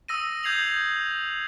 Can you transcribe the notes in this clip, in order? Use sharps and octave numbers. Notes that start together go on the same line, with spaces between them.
D#6 E6 A#6 D#7
D#6 G6 G#6 C7 F7 F#7